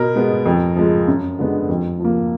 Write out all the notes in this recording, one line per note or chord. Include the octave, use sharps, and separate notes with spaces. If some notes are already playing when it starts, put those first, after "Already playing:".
Already playing: B2 A#4
G#3 B3
F2
F3 G#3
F#2
D3 G#3 B3
F2
F3
A#3